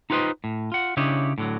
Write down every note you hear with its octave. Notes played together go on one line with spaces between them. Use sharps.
D#4 F4 G4 B4 C5 D#5
A2
F4 F#5
C#3 D4 E4 G4 C#5 D#5
A2 D3 F#3